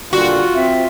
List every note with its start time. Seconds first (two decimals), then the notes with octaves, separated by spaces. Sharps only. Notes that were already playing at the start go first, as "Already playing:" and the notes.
0.13 A#2 D3 G3 F4 F#4
0.54 C4 E5